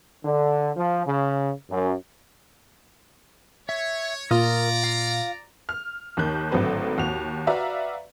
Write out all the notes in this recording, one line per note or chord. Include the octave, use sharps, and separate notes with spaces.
D3
F3
C#3
F#2
C#5 E5
A#2 F4 A#4 D5 A#5 D#6
F5
F6
D#2 D#3 F#6 G6
G#1 A2 D3 F#3 B4 C5
D#2 F#4 F7
F#4 B4 D5 E5 F5 A#5